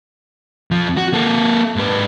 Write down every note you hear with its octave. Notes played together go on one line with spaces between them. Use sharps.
F2 F3
F#4
A#3 A4
G#2 B4